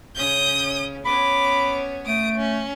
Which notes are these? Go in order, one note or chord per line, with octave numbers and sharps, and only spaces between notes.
C#3 C#4 D#6 G6
B3 C#4 C#5 B5 D6
A3 D#6 D7
C#4